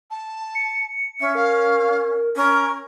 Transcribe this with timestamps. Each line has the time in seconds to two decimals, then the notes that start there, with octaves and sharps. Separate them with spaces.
0.10 A5
0.55 C#7
1.20 C#4 E5
1.35 A#4 F5
2.36 C#4 A#4